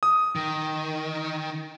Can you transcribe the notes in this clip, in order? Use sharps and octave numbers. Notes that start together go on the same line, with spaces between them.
D#6
D#3